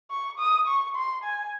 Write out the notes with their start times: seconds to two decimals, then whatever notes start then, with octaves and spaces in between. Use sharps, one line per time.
0.11 C#6
0.39 D#6
0.68 C#6
0.96 C6
1.24 G#5